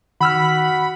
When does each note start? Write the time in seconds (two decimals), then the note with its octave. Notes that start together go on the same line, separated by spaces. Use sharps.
0.21 D#3 F#4 B5 E6 F6